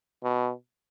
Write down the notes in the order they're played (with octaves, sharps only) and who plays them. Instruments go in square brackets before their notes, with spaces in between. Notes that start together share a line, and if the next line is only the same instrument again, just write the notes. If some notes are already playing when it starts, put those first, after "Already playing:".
[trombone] B2